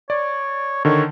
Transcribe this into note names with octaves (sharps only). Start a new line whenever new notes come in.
C#5 D5
D3 D#3 C#5